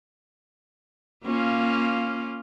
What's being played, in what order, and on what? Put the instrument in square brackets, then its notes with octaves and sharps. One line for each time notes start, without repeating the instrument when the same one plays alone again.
[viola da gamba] A#3 C#4 F4